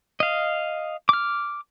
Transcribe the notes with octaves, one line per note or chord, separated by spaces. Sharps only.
D#5 F5
D6 F6